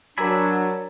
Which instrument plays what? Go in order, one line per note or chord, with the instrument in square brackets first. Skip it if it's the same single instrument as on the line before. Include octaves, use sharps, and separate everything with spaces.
[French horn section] F#3 [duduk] D4 [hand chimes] A#4 A#5 E6 [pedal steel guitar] D5 G#5 B5